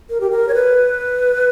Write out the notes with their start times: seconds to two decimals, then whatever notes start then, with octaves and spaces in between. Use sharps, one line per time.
0.10 A#4
0.21 G4
0.31 A#4
0.48 C#5
0.54 B4